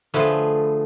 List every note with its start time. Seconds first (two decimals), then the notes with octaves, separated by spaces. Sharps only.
0.14 D3 F3 A3 G#4 B4